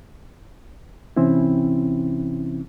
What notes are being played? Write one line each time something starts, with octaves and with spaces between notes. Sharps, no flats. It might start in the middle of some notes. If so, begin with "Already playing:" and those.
C3 E3 C4 C#4 E4